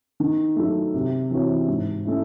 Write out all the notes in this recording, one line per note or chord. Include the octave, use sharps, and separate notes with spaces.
D#3
F#3 A3
C3
E3 C4 F#4 C#5
G#2
A3 C#4 E4